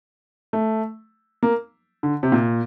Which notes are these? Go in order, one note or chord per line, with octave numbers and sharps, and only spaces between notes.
A3
A#3
D3
C3
A#2